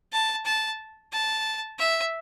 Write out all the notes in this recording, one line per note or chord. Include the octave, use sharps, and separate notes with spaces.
A5
A5
A5
E5